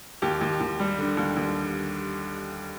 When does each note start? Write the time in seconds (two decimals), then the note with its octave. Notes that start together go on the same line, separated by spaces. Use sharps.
0.22 D#2 G4
0.41 D#2
0.60 D#2
0.79 G3
0.98 D3
1.17 D#2
1.37 D#2